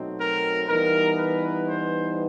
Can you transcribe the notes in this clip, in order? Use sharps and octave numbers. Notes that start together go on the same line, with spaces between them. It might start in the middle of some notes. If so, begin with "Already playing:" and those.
Already playing: B2 F#3 A3 C4 D#4
A#4
E3 G3 B3 D#4 A#4
B4
C5